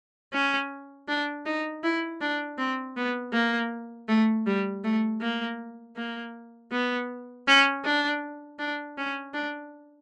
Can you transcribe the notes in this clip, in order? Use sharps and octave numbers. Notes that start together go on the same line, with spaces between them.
C#4
D4
D#4
E4
D4
C4
B3
A#3
A3
G3
A3
A#3
A#3
B3
C#4
D4
D4
C#4
D4